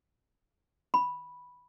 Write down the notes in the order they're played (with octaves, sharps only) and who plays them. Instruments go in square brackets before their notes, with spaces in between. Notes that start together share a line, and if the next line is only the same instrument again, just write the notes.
[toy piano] B5